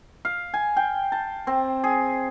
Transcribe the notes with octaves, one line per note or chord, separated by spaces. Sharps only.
F5
G#5
G5
A5
C4
G#4